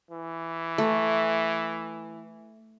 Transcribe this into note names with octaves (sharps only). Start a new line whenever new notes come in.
E3
A3